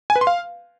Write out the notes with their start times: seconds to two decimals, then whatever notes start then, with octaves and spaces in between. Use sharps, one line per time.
0.10 G#5
0.16 B4
0.21 C6
0.27 F5